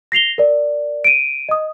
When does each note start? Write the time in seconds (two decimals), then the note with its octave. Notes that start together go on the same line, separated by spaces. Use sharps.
0.12 A#6 C7 F7 G7
0.38 A#4 D5
1.04 D7 D#7
1.49 D#5 D#6